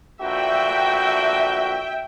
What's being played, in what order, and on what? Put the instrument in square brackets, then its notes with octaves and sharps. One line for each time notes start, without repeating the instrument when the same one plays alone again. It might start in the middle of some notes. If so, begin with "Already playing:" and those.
[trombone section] A#1 D3 F#4 [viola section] E5 G5